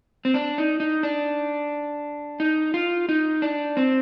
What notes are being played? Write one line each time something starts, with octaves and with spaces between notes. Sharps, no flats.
C4
D4
D#4
D#4
D4
D#4
F4
D#4
D4
C4